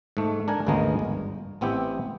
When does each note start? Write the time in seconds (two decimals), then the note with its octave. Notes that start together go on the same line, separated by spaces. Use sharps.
0.17 G#2 A3
0.48 D4 A#4 G#5
0.67 G#1 D2 C#3 G#3 B3 A#4
0.99 G1
1.61 A1 B3 C4 E4 G4